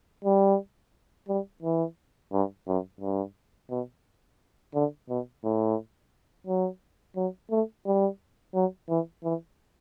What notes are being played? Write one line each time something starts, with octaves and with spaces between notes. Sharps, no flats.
G3
G3
E3
G2
F#2
G2
B2
D3
B2
A2
F#3
F#3
A3
G3
F#3
E3
E3